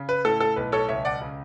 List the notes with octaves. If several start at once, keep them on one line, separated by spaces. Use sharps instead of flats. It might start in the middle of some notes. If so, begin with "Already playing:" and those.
Already playing: C#3
B4
A2 A4
A4
B1 B4
A4 C#5
C#2 C#5 E5
D5 F#5
C#3